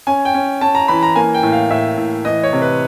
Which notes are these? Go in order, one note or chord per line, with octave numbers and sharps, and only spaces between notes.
C#4 G#5
G5
C#4
C#4 A5
A#5
E3 B5
A#5
A#3 G#5
G5
A2
F5
A2 E5
A2
E3 D#5
C#5
C3
B4